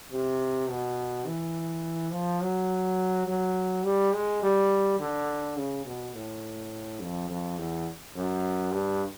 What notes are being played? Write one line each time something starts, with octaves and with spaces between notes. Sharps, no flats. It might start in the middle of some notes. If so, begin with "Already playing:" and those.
C3
B2
E3
F3
F#3
F#3
G3
G#3
G3
D3
C#3
B2
A2
F2
F2
E2
F#2
G2